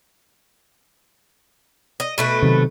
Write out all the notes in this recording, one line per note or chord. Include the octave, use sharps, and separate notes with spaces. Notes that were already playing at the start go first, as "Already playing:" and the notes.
D#5
B2 A3 B4
C3 D#3 F#3